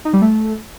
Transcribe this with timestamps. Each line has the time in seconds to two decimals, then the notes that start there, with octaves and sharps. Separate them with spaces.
0.05 D#4
0.13 G3
0.22 A3